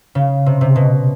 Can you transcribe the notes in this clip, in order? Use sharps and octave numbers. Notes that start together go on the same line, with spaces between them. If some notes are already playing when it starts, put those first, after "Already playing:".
C#3
C3
C3
B2